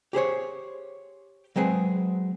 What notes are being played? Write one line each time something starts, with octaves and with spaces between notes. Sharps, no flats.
G4 G#4 C5 C#5
F#3 G#3 C4 G#4 B4